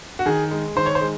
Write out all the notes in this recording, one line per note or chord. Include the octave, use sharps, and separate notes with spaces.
F#4
D#3 G#4
G#3
D#3 C5
C#5
C5
G#3